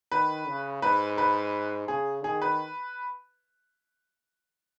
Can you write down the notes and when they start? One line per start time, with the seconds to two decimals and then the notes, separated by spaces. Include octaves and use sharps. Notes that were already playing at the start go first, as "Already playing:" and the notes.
0.12 D#3 B4
0.47 C#3
0.82 G#2 B4
1.18 B4
1.88 C#3 G#4
2.24 D#3 G#4
2.42 B4